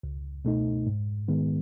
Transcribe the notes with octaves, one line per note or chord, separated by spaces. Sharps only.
C#2
B2 A3 D#4
G#2
D#3 G#3 B3